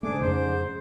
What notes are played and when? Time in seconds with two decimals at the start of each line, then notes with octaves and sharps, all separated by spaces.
0.03 G#2 C#3 A3 D4 G#4 D6
0.21 F2 C#3 C5